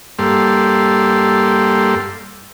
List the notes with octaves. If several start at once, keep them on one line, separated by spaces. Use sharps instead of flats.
G2 G3 A#3 A4 C6